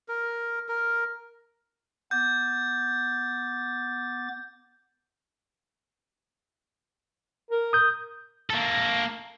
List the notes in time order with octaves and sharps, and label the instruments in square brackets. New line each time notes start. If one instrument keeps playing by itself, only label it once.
[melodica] A#4
A#4
[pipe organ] B3 D6 A6 [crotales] G6
[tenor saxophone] A#4
[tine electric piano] D#6 G6
[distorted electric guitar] A#3 A4